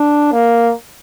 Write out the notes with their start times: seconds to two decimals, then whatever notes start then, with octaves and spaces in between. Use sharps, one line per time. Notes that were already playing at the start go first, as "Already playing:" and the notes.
Already playing: D4
0.33 A#3